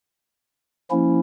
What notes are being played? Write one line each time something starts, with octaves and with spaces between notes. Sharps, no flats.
F3 A#3 C#4 E4